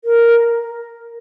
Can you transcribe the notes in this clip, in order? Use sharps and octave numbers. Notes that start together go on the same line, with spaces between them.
A#4